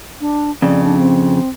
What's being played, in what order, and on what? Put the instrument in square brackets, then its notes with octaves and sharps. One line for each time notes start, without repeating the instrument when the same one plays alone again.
[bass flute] D4
[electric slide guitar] F2 C#3 [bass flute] D5
[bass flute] D4
C4